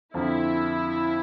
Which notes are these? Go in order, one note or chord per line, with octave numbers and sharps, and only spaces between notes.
F2 D3 F3 E4